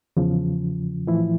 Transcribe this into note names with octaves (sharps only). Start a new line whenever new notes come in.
E2 C#3 F3
A2 E3 F3 E4